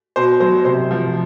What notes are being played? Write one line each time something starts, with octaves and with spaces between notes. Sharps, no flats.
B2 C5
F#3 C5
C3 C5
F3